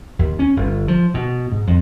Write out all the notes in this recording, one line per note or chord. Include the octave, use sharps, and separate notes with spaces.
D#2
C#4
G1
F3
B2
G#2
F2